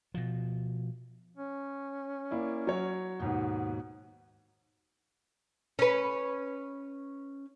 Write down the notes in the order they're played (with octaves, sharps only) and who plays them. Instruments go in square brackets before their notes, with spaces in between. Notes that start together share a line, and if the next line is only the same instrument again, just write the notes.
[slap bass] B2 F3
[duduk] C#4
[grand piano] A#3 E4 D5
F#3 C#5
[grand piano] D#2 G#2 B2 [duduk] B3
[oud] C#4 B4